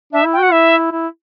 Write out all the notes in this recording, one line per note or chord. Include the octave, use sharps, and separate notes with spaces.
D4 E5
E4
G5
F#4 F#5
E4 E5
E4